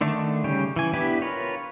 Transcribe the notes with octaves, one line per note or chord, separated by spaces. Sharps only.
D3 D#3 A3 D4
C#3 G3 C#4 G5
E3 G#5
B3 D4 E4 G4 B4
F4 A#4 B4 C#5